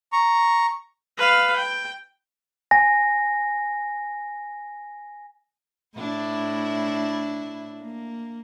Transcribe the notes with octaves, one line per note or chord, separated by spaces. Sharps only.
A#5 C#6
B4 F5
G5
G#5 A#6
A2 D4 E4
A#3